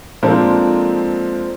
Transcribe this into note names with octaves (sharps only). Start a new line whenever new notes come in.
F3 G#3 A#3 C4 D4 A4